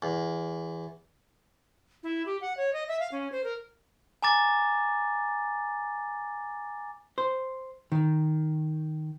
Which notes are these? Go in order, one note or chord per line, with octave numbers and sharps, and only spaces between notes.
E2
E4
G4
F#5
C#5
D#5
E5
F5
C#4
C5
A#4
G#5 A#5 D6 A6
C5
D#3